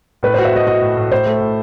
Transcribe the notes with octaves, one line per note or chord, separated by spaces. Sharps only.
A2 B4
C5
F#4
E5
F#4 D#5
F#4 D#5
A2
A2
A2 C5
A3
A2